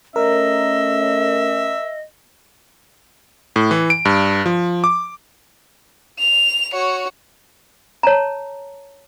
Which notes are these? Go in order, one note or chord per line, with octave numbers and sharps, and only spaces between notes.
A3 C#4 A#4 D#5 E5
A2
E3
D7
G2
F3
D6
F7
F#4 C#5
C#5 A5 A#5